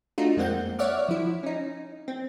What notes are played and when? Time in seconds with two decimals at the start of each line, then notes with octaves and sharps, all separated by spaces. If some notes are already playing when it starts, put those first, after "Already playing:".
0.18 A3 D4 D#4 F4 F#4
0.37 F2 G#3 A#3 C4 F#5 G6
0.79 C#5 D5 E5 F#5 D6 F6
1.08 F3 E4
1.43 C#4 D#4
2.08 C4